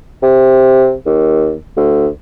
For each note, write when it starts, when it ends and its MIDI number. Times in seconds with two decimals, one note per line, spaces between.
0.23 0.93 48
1.06 1.55 39
1.77 2.07 38